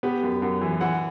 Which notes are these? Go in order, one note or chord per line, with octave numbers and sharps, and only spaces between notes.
B3 G4
F#2
F#2
E3
E3 F#5